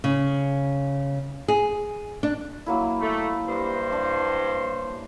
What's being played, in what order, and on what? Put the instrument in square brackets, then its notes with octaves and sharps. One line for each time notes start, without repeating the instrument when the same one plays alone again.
[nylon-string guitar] C#3
G#4
D4
[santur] F#3 A#3 E4
[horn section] A3
G2 C5
[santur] D4